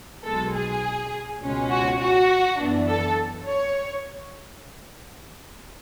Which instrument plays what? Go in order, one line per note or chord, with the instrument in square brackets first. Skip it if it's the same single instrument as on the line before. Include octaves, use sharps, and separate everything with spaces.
[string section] B1 B2 G#3 A4
G#4
C#2 B2 G#3 C#4
F#4
F#4
F#2 E3 B3 D4
A4
C#5